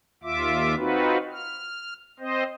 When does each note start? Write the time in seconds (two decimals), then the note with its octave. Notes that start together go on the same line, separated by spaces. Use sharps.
0.23 D#2 F4 E5 D6
0.76 C4 D#4 F4 F#4 B4
1.33 F6
2.20 C4 C5 D#5